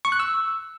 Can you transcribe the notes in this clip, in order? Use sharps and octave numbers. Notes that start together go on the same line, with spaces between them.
C#6
F#6
E6